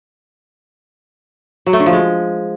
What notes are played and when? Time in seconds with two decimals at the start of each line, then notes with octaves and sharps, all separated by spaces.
1.66 F#3
1.73 A3
1.80 D3
1.86 F3
1.93 G#3